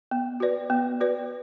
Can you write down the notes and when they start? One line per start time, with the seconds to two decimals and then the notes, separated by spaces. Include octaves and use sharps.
0.11 B3
0.40 F#4 B4 D5
0.70 B3
1.01 F#4 B4 D5